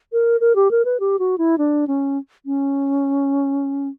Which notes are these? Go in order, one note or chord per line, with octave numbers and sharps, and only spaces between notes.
A#4
A#4
G4
A#4
B4
G4
F#4
E4
D4
C#4
C#4